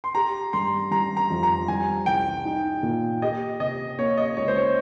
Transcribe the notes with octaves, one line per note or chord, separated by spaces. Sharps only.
C6
G4 A#5
G2 C6
G3 A#5
A#5
F2
A#5
G3 G#5
C2 G5
D#4
A#2
G4 D#5
C3 D#5
A#3 C#5
D#5
C#2 C#5
C5
C#5